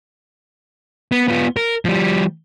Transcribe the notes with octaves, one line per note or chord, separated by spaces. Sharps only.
B3
B3 F4
A#4
F3 G3